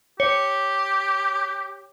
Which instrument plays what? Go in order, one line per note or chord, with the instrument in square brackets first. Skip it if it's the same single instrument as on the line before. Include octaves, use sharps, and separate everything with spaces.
[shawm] G4 [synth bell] C#5